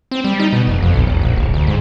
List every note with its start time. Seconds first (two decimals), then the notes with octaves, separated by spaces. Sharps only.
0.11 C4
0.25 G3
0.39 D#4
0.53 B2
0.67 F1
0.82 F2
0.94 B1
1.06 E1
1.21 A#1
1.36 D1
1.54 D2
1.67 G#2